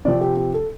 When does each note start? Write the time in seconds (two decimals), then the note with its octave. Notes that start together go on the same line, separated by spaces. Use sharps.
0.05 C3 F3 C4 D5
0.21 G4
0.37 G4
0.54 A4